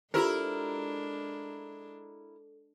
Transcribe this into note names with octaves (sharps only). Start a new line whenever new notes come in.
G#3 D4 E4 F4 G4 A4 A#4 C5